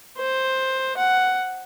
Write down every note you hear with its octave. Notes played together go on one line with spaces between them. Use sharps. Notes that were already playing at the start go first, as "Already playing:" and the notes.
C5
F#5